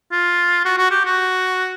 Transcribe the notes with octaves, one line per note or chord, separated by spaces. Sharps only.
F4
F#4
F#4
G4
F#4